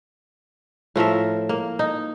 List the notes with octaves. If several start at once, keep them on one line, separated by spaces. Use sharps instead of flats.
A2 F3 A#4 E5
A#3
D#4